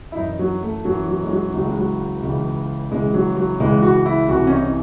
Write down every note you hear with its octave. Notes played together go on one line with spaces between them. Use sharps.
E4
F#2 E3 D#4
F#3
A3
F#2 E3 F#3
F#3
G#3
F#3
C#2 C#3 E3 F#3
G#3
F#3
C#2 C#3 E3
C#2 C#3 E3 G#3
F#3
F#3
C#2 C#3 E3 G#3
F#4
E4
C2 C3 E3 F#4
C#4
D#4